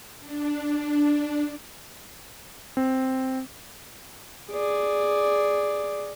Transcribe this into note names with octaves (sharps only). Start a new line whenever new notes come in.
D4
C4
G#4 D5